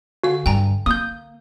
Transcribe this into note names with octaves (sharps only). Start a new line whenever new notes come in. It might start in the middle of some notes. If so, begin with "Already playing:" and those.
D3 F#4 F5
G2 G5 G#5 A#5
A#3 D#6 G6